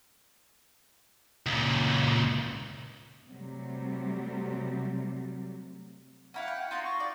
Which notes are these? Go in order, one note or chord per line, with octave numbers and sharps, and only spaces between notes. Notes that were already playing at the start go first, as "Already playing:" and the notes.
C#2 A#2
C3 F#3 G3 A3
C#4 E4 F5 F#5
G5
D#4 F4 F#4 C6
C#6
D5